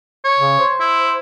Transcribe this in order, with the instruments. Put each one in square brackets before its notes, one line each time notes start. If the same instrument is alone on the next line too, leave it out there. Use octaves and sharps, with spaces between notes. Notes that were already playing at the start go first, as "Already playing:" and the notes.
[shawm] C#5
[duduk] C#3
C5
[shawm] E4